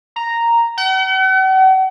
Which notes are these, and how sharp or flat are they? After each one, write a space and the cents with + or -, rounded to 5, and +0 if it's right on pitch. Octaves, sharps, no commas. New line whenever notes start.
A#5 -5
F#5 +45